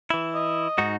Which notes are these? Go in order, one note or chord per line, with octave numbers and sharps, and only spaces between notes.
E3 E4
D#5
G#2 D#4 F#4